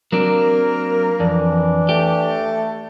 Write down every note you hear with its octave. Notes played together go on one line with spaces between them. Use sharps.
F#3 A#3 C4 D4 A#4
F2 E3 D4
A3 G4